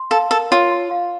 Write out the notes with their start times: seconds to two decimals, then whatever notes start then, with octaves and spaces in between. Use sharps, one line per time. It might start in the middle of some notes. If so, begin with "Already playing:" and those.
Already playing: C6
0.11 A4 F5
0.31 A4 A#4
0.51 F4 C#5
0.72 C6
0.91 F5